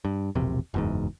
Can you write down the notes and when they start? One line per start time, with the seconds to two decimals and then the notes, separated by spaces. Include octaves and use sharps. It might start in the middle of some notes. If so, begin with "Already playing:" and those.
0.05 G2
0.35 E1 A#1 C3
0.74 F#1 E2 G#2